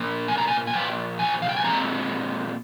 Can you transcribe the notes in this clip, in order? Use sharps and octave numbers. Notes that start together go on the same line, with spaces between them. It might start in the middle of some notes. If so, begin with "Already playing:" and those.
Already playing: A#2 F3 A#3
G#5
A#5
G#5
G#5
A#2 F3 G5
G#5
F5
G5
G#5
A#2 G#3 C4 A#5